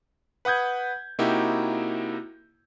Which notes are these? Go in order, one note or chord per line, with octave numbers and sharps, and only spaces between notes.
B4 F#5 D#6 G6 G#6
C3 A#3 D#4 E4 F#4 G4